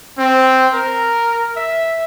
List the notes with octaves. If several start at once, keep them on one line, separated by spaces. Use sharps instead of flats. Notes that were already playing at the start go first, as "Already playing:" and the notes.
C4
A#4
E5